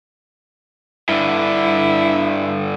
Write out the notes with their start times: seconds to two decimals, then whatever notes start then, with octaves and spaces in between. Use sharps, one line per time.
1.09 G2 D3 E4